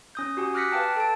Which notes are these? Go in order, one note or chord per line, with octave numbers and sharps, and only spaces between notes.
C#4 D#6 G6
F#4 G4 G#5 D#6
D6 F6 F#6 A#6 B6 C#7
B4 F5 G5 A5
A4 A5 D7